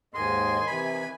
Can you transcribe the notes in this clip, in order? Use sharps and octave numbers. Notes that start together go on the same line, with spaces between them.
D#2 G#2 D#3 D#5 G#5 C6
C3 E3 B5